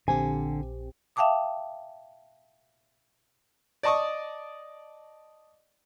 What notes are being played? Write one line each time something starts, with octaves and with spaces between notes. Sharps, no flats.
A#1 D3 C4 G4 G#5
E5 F5 G5 A5 D6 D#6
D5 D#5 A5 C#6 D#6